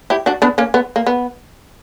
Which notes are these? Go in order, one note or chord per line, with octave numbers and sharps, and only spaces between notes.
E4 G4
D4 F#4
B3 D4
A#3 C#4
B3
A#3
B3